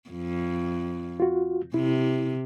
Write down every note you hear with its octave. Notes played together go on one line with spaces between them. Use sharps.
F2
F4 F#4
C3 E4